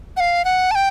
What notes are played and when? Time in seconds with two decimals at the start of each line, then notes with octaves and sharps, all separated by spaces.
0.17 F#5
0.20 F5
0.45 F#5
0.71 A5
0.75 G5